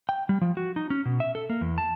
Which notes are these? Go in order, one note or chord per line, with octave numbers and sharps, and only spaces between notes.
G5
G3
F3
F#4
D#4
C#4
B2
E5
A4
A#3
E2
A5